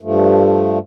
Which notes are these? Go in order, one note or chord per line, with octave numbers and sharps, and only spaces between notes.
G2 F3 A3